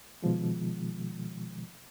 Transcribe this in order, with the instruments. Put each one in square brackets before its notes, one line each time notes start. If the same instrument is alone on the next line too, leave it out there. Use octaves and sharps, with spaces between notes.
[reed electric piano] B2 D#3 F3 G#3